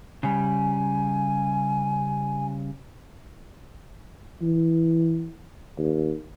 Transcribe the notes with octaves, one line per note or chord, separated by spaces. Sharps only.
C#3 G3 G#5
E3
D#2